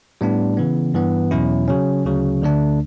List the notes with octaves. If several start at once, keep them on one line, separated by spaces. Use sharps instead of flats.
A2 G3 B3 D4
C#3 E3 B3
G2 E3 B3
E2 B2 F#3 C#4 E4
C#3 F#3 C#4
D2 C#3 F#3
D2 D3 A3 D4